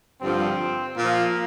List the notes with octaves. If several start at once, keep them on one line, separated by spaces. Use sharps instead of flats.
G2 D3 F3 C4
A#2 F3 A#3